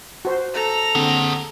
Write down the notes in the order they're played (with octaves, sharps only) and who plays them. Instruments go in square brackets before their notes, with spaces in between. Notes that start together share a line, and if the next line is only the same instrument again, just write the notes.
[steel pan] F#4 C5
[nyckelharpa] A4 A#5
[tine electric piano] D3 C4 [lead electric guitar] G#4 F#5